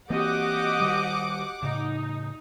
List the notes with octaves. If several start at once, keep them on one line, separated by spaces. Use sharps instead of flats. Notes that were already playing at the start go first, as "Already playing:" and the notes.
E3 A#3 C4 F#4 G4 D#5 F#5 D6
D#3 G3
A2 C#3 D#4